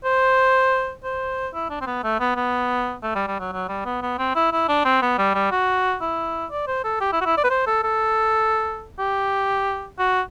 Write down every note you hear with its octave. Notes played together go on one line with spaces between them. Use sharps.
C5
C5
E4
D4
C4
B3
A3
B3
B3
A3
G3
G3
F#3
F#3
G3
B3
B3
C4
E4
E4
D4
C4
B3
G3
G3
F#4
E4
D5
C5
A4
G4
E4
F#4
E4
D5
B4
C5
A4
A4
G4
F#4